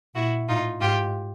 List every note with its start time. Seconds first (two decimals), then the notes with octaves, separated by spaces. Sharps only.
0.15 A#2 E4 F#4
0.48 A2 D#4 F4
0.80 G#2 F4 G4